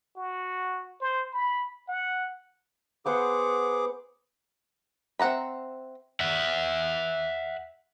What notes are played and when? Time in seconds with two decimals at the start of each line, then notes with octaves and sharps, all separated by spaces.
0.16 F#4
1.00 C5
1.33 B5
1.88 F#5
3.06 B3 G#4 C5 F#5 D6
5.19 C4 E5 F#5 A#5 B5
6.20 E5 F#5